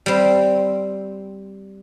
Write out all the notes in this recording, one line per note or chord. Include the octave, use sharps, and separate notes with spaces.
G3 C4